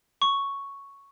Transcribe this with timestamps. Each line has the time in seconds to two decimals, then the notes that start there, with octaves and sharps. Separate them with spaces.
0.22 C#6